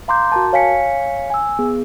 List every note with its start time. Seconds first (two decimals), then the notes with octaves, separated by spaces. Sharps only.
0.08 F5 A#5 C6 D6 G6
0.32 F#4 A#4 A5
0.53 C#5 F5 G#5 B6 C#7
1.30 G#5 E6
1.59 B3 G#4